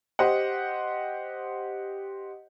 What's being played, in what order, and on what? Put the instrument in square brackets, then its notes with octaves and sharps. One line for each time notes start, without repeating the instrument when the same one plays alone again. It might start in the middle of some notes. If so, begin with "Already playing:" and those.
[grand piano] G4 C5 D#5 F#5